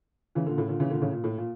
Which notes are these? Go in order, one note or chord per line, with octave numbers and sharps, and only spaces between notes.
C#3 E3
A#2 D3
A2 C#3
A#2 D3
C#3 E3
A#2 D3
A2 C#3
A#2
A2
A#2